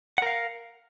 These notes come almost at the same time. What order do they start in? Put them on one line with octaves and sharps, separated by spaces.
F#5 A#4 F5